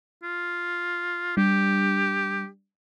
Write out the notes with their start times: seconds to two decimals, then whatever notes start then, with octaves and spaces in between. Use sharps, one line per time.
0.23 F4
1.37 G3 D4 G4